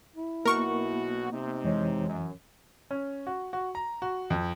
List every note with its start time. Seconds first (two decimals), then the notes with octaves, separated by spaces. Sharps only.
0.16 E4
0.45 B1 B2 A#3 B3 F#4 A#4 C#6
1.32 C3 D#4
1.64 F2 E3 G#3 C#5
2.07 F#2
2.91 C#4
3.27 F#4
3.53 F#4
3.75 A#5
4.02 F#4
4.30 F2